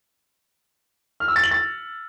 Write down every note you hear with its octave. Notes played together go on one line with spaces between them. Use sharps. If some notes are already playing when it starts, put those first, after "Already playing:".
F6
E6
A6
F#7
A6